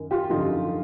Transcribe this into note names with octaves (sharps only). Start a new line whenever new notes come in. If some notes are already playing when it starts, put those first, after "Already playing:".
Already playing: F#2 D#3
F4 G4
F#2 D3 F3 D#4 F4